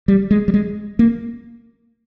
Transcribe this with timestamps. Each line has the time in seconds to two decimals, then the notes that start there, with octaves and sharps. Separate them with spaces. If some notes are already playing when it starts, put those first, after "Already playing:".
0.08 G3
0.31 G#3
0.48 G3
0.54 G#3
0.99 A#3